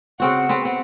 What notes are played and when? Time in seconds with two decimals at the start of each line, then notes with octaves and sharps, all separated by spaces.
0.20 C#3 C4 F#4 F#5
0.49 B3 C4
0.65 C4 F#5